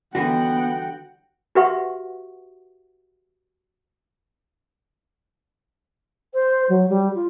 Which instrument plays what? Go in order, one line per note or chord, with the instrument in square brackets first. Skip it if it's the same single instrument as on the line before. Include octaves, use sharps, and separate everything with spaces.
[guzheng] D3 E3 G3 [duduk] B3 [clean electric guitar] F#4 [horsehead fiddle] F#5 G5
[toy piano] F#4 G4 B4 E5 F#5 C#6
[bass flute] C5
F#3
G3
F4